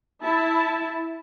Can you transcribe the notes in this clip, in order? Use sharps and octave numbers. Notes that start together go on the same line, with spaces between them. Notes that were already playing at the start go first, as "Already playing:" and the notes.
E4 A5